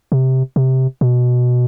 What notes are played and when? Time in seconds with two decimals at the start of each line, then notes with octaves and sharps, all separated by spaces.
0.12 C3
0.56 C3
1.01 B2